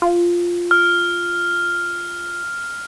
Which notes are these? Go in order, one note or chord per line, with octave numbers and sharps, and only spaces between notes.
F4
F6